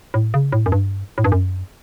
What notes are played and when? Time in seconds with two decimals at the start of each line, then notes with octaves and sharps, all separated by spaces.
0.14 A2
0.34 C#3
0.52 A2
0.66 F#2
0.72 G2
1.18 A2
1.24 G2
1.32 F#2